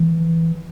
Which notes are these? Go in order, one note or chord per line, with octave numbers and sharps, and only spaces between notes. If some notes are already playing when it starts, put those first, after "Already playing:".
Already playing: E3